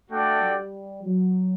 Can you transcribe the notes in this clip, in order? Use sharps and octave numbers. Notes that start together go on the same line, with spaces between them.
A3 D4 F#4 A4 D5 G5
G3
F#3